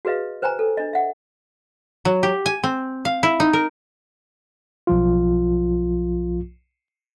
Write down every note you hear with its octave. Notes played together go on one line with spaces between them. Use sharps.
F#4 G#4 B4 D#5 F5
B4 C5 G5 G#5 A#5
A4
D4 D#5
E5 F#5
F#3
G4
G#5
C4
F5
E4
D#4
A#4
B1 F3 F4